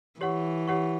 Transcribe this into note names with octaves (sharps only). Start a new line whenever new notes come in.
E3 G4 C#5 F#5 C#6
G4 C#5 F#5 C#6